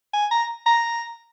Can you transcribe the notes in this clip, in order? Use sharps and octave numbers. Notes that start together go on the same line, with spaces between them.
G#5
A#5
A#5